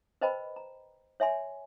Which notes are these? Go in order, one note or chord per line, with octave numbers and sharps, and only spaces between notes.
B4 C5 D#5 G5 A5 B5
A#5
C#5 E5 G#5 C6